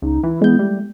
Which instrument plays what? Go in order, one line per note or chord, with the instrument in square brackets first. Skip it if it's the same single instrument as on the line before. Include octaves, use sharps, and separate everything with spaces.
[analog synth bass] C#2 [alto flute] D#4
[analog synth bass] E3 [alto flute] E4
[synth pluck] G#3 G6 [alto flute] B3
[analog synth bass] G3 [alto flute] A3